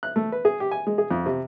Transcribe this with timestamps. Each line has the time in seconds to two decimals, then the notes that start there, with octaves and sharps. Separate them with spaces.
0.03 F#6
0.16 A3
0.32 B4
0.45 G#4
0.60 G4
0.71 G#5
0.87 G#3
0.98 G#4
1.11 F2
1.26 C3